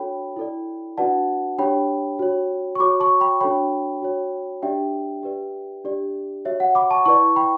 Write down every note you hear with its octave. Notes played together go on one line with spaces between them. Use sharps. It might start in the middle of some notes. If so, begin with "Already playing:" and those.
Already playing: D4 F#4 A4 C#5 G5 B5
E4 A4 D5
D4 F#4 B4 D5 F#5 A5
D4 G4 C#5 G5 B5
F#4 C#5
C#6
F#4 C#5 B5 D6
A5 C#6
G5 B5
D4 F#4 A4 C#5 G5 B5
F#4 C#5
D4 G4 D5 E5 G5
G4 B4 D5
D4 G4 D5
F#4 C#5 E5
F#5
B5 D6
A5 C#6
E4 B4 D5 A5 C#6
G5 B5